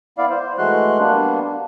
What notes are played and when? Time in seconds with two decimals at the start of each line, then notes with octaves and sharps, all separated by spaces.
0.18 B3 E4 D5 F5
0.30 C5
0.58 E3 G#3 A3 F#4 C6 F#6
0.99 G3 A#3 B3 D4